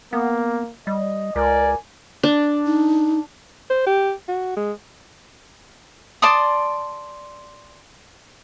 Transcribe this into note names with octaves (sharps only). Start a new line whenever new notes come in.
A#3 B3
G3 D#5
C#2 A#4 D5 G#5
D4
D#4
C5
G4
F#4
G#3
D5 A5 C6 D#6